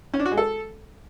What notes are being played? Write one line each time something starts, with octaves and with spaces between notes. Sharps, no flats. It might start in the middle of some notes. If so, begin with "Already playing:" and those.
C#4
D4
F#4
G#3
A4